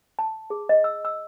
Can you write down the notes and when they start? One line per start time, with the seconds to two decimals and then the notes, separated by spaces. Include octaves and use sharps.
0.19 A5
0.50 G#4
0.69 D#5
0.84 E6
1.05 E6